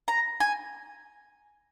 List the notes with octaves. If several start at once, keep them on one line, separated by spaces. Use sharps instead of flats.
A#5
G#5